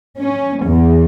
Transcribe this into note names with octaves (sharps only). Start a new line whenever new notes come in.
C#4
E2